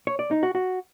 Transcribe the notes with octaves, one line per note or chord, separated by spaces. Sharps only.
C#5
D5
D#4
F#4
F#4